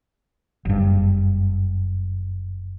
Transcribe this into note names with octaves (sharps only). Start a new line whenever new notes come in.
F#1 G2